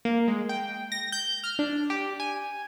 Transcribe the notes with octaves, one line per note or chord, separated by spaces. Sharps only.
A#3
G#3
G5
A#6
G6
F6
D4
G4
G#5